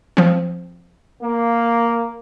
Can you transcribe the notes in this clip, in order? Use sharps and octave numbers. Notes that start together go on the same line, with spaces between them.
F3 C4
A#3